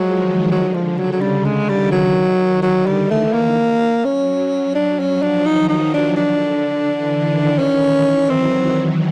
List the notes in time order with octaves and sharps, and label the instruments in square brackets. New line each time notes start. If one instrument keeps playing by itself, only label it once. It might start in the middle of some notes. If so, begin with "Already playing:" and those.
Already playing: [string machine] F3 G#3 [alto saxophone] F#3
[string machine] D#3
[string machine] D3 [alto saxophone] F#3
[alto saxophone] F3
[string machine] C#3
[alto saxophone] F#3
F#3
[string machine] D3 [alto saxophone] G3
[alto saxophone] G#3
[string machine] D#3
[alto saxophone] G3
F#3
[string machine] D3 [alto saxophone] F#3
[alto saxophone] G3
[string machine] E3
[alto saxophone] A3
A#3
[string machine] F#3 [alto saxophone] C#4
[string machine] F#3 [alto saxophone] D4
[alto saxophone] C#4
[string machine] F3
[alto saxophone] D4
[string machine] D#3 [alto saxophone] D#4
[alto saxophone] D#4
D4
[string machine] D3 [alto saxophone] D4
[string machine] E3
D#3
[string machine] D#3 [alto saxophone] C#4
[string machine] E3
[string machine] F#3 [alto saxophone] C4